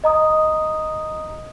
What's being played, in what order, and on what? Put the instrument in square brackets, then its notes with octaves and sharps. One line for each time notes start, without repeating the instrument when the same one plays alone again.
[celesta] D#5 A#5 D#6